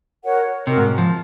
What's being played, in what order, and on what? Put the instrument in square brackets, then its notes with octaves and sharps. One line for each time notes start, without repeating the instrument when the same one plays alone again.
[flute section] F#4 A#4 C#5 F#5
[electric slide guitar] C3 [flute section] D#4 F#4 A#4 D#5
[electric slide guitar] G#2
F3